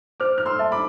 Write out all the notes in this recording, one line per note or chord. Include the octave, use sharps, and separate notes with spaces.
C5 D6 F6
F6
C6 E6
E5 A5
B5 D6